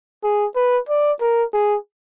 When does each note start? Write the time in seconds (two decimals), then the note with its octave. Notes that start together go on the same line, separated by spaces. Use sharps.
0.23 G#4
0.56 B4
0.89 D5
1.21 A#4
1.53 G#4